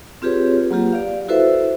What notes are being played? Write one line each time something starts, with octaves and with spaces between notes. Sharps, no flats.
C4 F4 G4 G#4 B4 C#5
F#3 A#3 F4 G4
D5 F5
E4 F#4 A4 B4 C5 E5